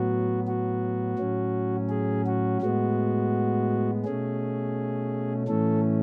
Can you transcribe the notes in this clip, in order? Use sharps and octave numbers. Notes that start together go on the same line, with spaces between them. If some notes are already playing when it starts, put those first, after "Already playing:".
Already playing: A2 F#3 B3 F#4
F#4
A2 F#3 C#4
G#4
F#4
A2 G#3 B3 F#4
B2 A3 C#4 G#4
A2 E3 A3 C#4 A4